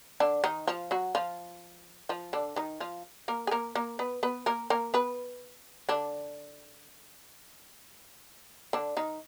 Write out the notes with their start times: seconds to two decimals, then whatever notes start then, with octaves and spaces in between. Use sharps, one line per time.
0.20 D3 D4
0.44 D#3 D#4
0.68 F3 F4
0.91 F#3 F#4
1.15 F3 F4
2.09 F3 F4
2.33 D3 D4
2.56 D#3 D#4
2.80 F3 F4
3.28 A#3 A#4
3.47 G#4
3.51 A#3 A#4
3.75 A#3 A#4
3.99 B3 B4
4.23 B3 B4
4.46 A#3 A#4
4.70 A#3 A#4
4.94 B3 B4
5.89 D3 D4
8.73 D3 D4
8.97 D#3 D#4